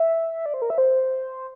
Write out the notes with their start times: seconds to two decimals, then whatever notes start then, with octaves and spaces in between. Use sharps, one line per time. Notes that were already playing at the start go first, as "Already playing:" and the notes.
Already playing: E5
0.46 D5
0.54 C5
0.62 A#4
0.70 E5
0.78 C5